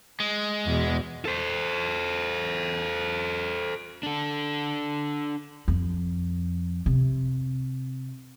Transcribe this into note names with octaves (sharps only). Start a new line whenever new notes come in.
G#3
E2 B2
A4 C5
D4 A4
F2
C3